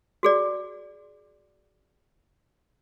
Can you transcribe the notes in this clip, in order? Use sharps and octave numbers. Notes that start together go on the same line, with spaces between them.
F#4 G#4 D5